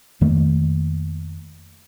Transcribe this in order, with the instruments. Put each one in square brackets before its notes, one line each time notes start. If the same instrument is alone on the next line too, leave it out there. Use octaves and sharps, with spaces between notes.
[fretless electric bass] F2 D#3 A3 A#3